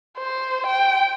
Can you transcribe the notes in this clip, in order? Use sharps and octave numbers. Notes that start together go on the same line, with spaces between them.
C5
G5